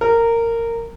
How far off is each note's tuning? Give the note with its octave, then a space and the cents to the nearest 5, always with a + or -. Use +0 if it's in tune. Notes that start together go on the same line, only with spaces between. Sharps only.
A#4 -15